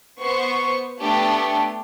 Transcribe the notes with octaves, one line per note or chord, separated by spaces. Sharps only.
B3 C5 C#6
A3 B3 D4 G4 A4 A5